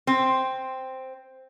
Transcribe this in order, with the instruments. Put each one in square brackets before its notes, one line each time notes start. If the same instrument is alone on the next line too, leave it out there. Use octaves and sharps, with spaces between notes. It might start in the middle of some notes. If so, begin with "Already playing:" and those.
[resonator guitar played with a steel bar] C4